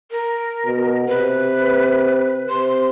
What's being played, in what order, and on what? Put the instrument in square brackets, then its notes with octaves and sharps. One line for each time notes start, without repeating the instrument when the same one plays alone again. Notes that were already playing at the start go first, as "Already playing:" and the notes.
[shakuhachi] A#4
[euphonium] B2
[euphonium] C3 [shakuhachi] B4
[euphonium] C3 [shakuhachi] C6